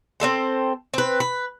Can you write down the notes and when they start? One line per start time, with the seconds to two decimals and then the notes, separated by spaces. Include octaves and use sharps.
0.20 C4 D#4 A4 C5
0.94 C4 B4
1.20 B4